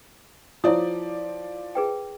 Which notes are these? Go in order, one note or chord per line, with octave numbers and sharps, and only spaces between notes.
F3 E4 C#5 D5 D#6
G#4 B4 G5